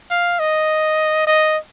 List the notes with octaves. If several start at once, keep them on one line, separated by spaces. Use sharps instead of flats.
F5
D#5
D#5